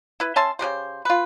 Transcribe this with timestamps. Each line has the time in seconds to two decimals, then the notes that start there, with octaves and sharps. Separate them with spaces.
0.20 E4 B4
0.36 C#4 E5 A5 C6
0.59 C#3 F#3 G4 C5
1.05 F4 B4